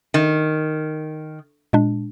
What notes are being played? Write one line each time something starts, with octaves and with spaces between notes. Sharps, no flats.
D#3
A#2 G#3 D4